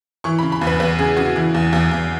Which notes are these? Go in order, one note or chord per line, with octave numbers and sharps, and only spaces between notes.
E3 C#6
B5
C#3
B5
E2
B4
E2 B4
C#3 G#4
C#3 F#4
E3
E2
E2
E2